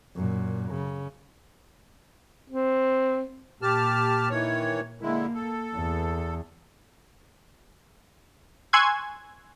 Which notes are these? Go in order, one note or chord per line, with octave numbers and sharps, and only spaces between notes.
F#2 A#2
C#3
C4
A#2 G4 A5 F6
D#3 E3 C#5
D3 G#3 A#3 E4
A4
E2
G#5 C6 C#6 E6 F#6 G#6